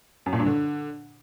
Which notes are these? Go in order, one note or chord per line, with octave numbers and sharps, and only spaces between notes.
F#2
A#2
G2
D3